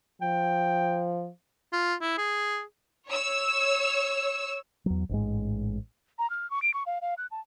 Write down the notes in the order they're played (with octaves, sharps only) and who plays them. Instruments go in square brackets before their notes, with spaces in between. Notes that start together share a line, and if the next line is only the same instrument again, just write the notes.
[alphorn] F3 [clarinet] G5
[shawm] F4
E4
G#4
[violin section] C#5 E6
[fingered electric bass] E2 F#3
A1 G#2 G#3
[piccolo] A#5
F6
C#6
D7
C#6
F5
F5
F#6
A5